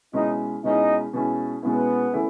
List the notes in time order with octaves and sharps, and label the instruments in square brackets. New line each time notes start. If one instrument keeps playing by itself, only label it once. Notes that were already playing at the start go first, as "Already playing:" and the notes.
[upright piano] B2 G#3 C#4 E4 [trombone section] D#4
[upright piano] B2 G#3 C#4 E4 [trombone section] D#4
[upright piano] B2 G#3 C#4 E4
[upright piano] B2 G#3 C#4 E4 [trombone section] B3
[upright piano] E3 A3 C#4 E4